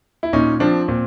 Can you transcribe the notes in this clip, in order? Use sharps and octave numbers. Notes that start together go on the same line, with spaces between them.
E4
A#2 C#4 D#4
F3 C4 D4
A#2 C4